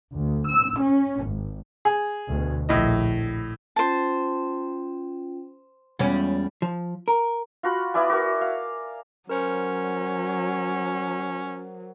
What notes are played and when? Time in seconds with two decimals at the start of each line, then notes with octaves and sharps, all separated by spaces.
0.15 D2
0.50 E6
0.83 C#4
1.25 G#1
1.85 G#4
2.30 D2 B2
2.69 A#1 A2 E4 D#5
3.76 C#4 F4 C5 G5 A5
5.99 E2 G3 G#3 C#4 F4
6.62 F3
7.08 A#4
7.63 F4 F#4 B5
7.94 B3 E4 D5 G#5
8.10 F#4 A#4
8.41 F5
9.29 F#3 C#4 A#4 C5